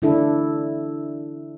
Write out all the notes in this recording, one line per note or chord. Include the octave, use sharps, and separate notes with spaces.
D3 D4 E4 A4